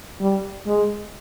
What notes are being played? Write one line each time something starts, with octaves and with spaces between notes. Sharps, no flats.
G3
G#3